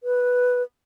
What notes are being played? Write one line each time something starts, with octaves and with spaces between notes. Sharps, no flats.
B4